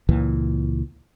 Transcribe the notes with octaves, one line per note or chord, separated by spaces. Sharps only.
C#2 A#2 E3